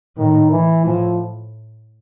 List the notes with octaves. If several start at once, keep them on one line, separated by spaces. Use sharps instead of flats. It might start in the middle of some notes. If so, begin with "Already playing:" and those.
A2 D#3
E3
A2 F3